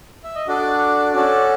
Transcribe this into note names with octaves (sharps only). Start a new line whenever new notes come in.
E5
D#5
D4 F#4 A4 D5
C#4 F#4 A4 D5